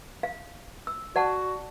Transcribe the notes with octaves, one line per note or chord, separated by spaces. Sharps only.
F5
E6
F#4 D5 F#5 A5